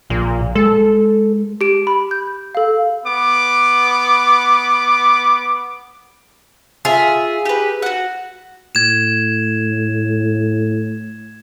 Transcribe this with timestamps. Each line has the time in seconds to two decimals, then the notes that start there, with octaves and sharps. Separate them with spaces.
0.10 A#1 A#2
0.55 G#3 A4
1.61 G4 D7
1.87 B5
2.11 G6
2.55 A4 F5
3.06 B3 D6
6.85 F4 G#4 E5
7.45 G4 B4
7.82 F#4 F#5
8.75 A2 G#6 E7